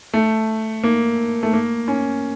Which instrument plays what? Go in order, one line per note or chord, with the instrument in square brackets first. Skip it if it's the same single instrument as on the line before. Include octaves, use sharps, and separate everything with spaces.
[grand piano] A3
A#3
A3
A#3
C#4